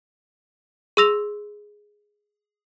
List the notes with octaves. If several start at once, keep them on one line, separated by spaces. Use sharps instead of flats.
G#4 C6 E6 A#6 F7